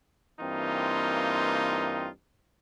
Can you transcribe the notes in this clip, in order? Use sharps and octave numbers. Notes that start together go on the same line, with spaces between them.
G2 E3 A#3 C4 D#4 F4